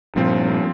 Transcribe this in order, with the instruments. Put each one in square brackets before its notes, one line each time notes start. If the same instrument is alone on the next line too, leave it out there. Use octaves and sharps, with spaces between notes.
[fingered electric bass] G2 A#2 [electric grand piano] F3 C4 F4